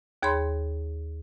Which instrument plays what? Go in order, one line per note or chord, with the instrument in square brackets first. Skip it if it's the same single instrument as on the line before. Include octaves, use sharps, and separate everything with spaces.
[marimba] D#2 G#4 C#5 B5 C6